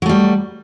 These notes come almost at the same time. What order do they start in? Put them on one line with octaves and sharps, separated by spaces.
F#3 A3 G3